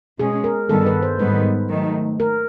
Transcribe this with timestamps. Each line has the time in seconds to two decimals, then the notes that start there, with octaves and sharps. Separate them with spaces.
0.19 B2 G#3 C#4 G#4
0.44 A#4
0.69 G2 D#3 G3 B3 A4
0.86 B4
1.02 C5
1.19 G#2 D#3 G3 B3 B4
1.69 D#3 F#3 A3
2.20 A#4